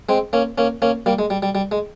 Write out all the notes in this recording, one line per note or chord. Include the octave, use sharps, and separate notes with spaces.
G#3 C4
A#3 C#4
A#3 C#4
A#3 C#4
G3 A#3
G#3
G3
G3
G3
G#3